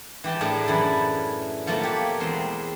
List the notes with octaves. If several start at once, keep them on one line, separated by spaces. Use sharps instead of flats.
E3 G4 G5 A5
A2 A3 D4 G#4 A#4 D5
F#2 E3 E4 A4 B5
B2 F3 F#3 A3 A#3
G4 C#5
E2 G#3 C4 C6